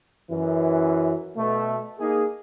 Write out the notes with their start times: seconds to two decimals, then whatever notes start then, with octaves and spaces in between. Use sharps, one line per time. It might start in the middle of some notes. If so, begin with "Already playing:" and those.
0.30 F#2 E3
1.37 B2 A3
1.99 A#3 D#4 G#4